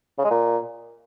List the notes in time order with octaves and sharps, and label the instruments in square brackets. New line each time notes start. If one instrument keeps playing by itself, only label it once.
[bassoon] C#3
G#3
A#2